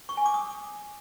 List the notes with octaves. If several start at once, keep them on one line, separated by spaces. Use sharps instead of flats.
C#6
G#5
D6
D#6